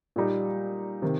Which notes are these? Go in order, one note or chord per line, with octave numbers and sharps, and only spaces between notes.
A#2 G3 D#4
C3 D#3